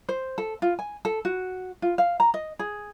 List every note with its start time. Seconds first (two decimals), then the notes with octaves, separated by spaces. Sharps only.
0.09 C5
0.38 A4
0.62 F4
0.79 G#5
1.05 A4
1.25 F#4
1.82 F4
1.98 F5
2.20 A#5
2.34 D#5
2.59 G#4